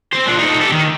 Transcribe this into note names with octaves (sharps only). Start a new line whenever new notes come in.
C4 C5
F3 D4
D#4 A4
G4 A4
D#3